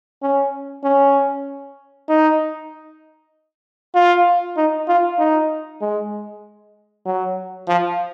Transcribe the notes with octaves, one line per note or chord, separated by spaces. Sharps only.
C#4
C#4
D#4
F4
D#4
F4
D#4
G#3
F#3
F3